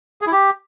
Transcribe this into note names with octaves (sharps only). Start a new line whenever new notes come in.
G#4
E4
G4